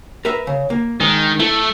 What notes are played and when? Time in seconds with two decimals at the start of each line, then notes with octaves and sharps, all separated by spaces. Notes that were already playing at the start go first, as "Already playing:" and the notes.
0.25 A#4 B4 E5
0.47 C#3
0.70 A#3
1.00 D#3 G#3
1.40 A3 E4